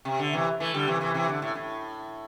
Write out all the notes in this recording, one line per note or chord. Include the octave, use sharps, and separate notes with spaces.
C3
D3
C3 E3
E3 A3
D3 G3
C3 E3
C3 E3
C3 E3
D3
A2
A2